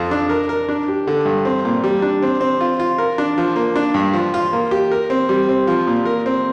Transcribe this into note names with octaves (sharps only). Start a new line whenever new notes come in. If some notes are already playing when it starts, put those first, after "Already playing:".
Already playing: F2 F3
D4
A#4
A#4
D4
G4
D3
G2
C4
A#2
G3
D4
C4
C4
F4
F4
A#4
D4
F3
A#3
D4
G2
F3
F4
A#3
G4
A#4
C4
G3
C4
F3
A#2
A#4
C4